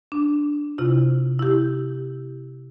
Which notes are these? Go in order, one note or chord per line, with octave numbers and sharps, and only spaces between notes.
D4
C3 E4 F4
E4 G4